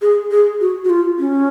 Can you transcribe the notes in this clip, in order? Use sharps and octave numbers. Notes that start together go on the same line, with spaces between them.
G#4
G#4
F#4
F#4
F4
C#4